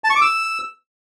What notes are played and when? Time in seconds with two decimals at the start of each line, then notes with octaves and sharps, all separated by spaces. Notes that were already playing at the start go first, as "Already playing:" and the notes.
0.04 A5
0.10 C#6
0.15 D6
0.21 E6